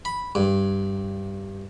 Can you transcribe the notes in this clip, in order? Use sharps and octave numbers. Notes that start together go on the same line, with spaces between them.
B5
G2